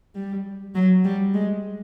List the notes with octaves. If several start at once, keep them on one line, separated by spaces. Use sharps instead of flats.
G3
F#3
G3
G#3